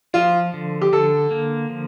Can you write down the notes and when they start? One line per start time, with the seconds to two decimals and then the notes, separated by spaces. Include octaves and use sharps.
0.14 F3 F4
0.54 D3
0.81 G4
0.92 D3 A4
1.31 A#3
1.69 F3